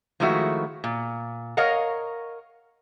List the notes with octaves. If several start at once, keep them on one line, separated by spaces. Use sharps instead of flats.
D#3 F3 G#3 A3 E4 F#4
A#2
A#4 C#5 D#5 F5 F#5